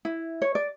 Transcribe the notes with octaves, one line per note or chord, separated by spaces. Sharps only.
E4
C#5
D5